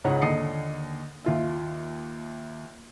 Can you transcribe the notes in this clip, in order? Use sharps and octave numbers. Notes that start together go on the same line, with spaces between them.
C#2 G#2 C#3 C#5 D#5 F#5
D#2 D3 D#5 D#6 C7 C#7
D#2 F4 E5